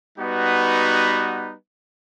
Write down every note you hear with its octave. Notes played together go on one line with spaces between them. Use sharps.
G3 B3 D#4 F#4 B4